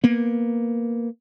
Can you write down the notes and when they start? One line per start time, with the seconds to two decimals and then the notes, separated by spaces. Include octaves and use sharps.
0.04 A#3 B3